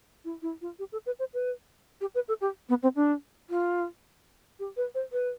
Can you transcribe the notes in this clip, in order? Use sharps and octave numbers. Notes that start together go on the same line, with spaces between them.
E4
E4
F4
G4
A4
B4
C5
B4
G4
B4
A4
G4
B3
C4
D4
F4
G4
B4
C5
B4